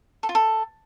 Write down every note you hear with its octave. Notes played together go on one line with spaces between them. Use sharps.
A4
F4
A4